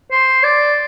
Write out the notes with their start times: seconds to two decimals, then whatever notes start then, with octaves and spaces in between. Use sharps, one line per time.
0.12 C5
0.43 D5